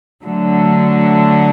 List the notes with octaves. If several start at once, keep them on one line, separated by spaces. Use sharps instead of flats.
D3 F#3 A3